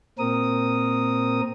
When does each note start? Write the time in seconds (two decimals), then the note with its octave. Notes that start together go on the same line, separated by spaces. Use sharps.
0.19 A#2 C4 A#4 D#6